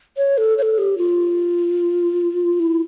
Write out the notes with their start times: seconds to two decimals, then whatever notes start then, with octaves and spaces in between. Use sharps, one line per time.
0.17 C#5
0.38 A4
0.58 C#5
0.62 A4
0.78 G4
0.98 F4
2.60 E4